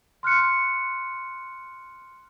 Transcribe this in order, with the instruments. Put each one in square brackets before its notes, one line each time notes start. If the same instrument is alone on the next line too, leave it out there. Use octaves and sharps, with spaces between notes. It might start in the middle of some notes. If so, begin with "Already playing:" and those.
[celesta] C6 F6 F#6 C#7